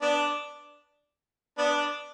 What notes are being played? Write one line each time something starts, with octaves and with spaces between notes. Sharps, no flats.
B3 D4
B3 D4